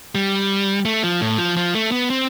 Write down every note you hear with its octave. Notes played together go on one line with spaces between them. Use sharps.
G3
A3
F3
A2
F3
F3
A3
B3
C4